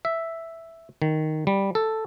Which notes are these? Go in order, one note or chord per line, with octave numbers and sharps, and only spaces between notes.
E5
D#3
G3
A4